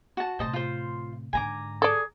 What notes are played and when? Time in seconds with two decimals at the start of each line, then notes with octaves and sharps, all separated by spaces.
0.17 F#4 A5
0.39 A2 C3 C5 D#5 A5
0.53 F4 C5
1.33 G#2 D3 G#5 A#5 D6
1.82 G#4 A4 D5